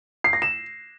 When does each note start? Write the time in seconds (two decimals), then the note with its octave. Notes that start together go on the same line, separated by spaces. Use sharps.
0.24 C7
0.33 A#6
0.42 E7